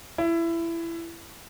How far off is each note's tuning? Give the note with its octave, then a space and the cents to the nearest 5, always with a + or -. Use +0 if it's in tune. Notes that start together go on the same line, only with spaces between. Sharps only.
E4 +20